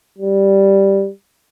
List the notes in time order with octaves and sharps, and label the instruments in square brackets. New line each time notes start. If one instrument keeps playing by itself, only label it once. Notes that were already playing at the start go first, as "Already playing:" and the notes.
[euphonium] G3